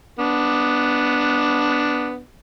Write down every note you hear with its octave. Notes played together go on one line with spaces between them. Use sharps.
B3 D4